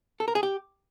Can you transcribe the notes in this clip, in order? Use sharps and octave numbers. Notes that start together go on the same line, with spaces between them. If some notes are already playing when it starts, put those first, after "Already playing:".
A4
A#4
G#4
G4